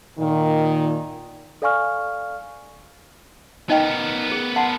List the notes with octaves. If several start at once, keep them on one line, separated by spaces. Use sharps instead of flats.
A#2 D#3
A4 D5 F5 G#5 C#6 F6
B3 D#4 A#4 D#5 G5
G#4
F#5 A5 C6